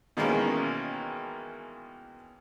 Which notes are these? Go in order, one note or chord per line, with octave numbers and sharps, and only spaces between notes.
B2 D#3 E3 G#3 A#3 C#4